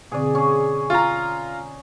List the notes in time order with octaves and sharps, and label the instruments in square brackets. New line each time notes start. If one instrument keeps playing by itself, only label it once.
[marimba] B2 D3 C4 [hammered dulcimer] G#4 D5
[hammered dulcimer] C#4 G#4
[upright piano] F4 A#5 [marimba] C#6 A6